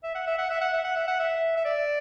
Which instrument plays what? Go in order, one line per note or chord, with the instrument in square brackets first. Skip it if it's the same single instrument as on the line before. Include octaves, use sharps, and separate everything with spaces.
[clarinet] E5
F#5
E5
F#5
E5
F#5
E5
F#5
E5
F#5
E5
E5
D5